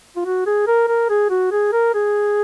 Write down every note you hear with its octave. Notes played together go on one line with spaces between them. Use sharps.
F4
F#4
G#4
A#4
A#4
G#4
F#4
G#4
A#4
G#4